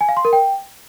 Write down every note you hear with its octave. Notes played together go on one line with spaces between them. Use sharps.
G#5
F5
C6
A#4
G5